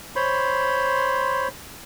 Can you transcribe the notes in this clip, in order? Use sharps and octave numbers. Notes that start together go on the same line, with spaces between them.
C5 C#5 B5 C6